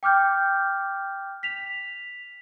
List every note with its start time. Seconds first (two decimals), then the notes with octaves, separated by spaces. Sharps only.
0.03 G5 D6 F6 G6
1.43 B6 F7